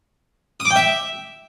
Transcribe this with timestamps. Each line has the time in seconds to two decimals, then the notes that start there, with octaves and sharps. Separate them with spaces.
0.60 D#6
0.65 D6
0.70 G5
0.76 E5